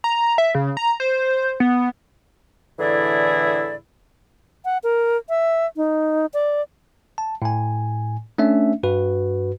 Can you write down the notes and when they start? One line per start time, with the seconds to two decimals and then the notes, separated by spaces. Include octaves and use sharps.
0.04 A#5
0.38 E5
0.55 C#3
0.77 A#5
1.00 C5
1.60 B3
2.80 A2 D3 E3 E4 G#4 D5
4.65 F#5
4.83 A#4
5.29 E5
5.76 D#4
6.34 D5
7.18 A5
7.42 A2 G#5
8.38 A3 C#4 D4 E5
8.83 G2 F#4 B4